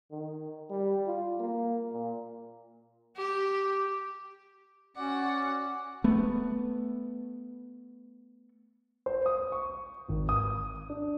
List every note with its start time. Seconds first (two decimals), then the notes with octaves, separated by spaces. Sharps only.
0.11 D#3
0.70 G3
1.07 F4
1.40 A#3
1.92 A#2
3.17 G4
4.97 C#4 F#4 D5 F#5
6.04 A3 B3
9.06 C5
9.26 D#6
9.52 C#6
10.08 G#1
10.29 D#6
10.90 D4